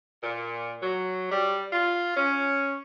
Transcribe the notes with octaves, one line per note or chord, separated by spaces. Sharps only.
A#2
F#3
G3
F4
C#4